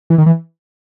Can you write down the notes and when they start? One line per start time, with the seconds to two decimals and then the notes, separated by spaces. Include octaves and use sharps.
0.10 E3
0.18 D#3
0.26 E3